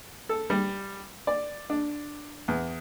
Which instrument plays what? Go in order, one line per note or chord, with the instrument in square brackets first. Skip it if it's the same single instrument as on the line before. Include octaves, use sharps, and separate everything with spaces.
[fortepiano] A4
G3
D5
D4
E2